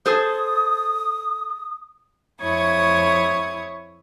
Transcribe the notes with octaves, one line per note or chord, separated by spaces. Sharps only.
G#4 A4 C5 D#6
F2 E4 C#5 C#6 D#6 G#6